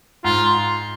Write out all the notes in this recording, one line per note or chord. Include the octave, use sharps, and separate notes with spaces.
G#2 F4